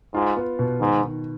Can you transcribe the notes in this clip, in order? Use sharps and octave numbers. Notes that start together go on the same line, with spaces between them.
G#2 F4
B3
B2
G#2 D#3
D#3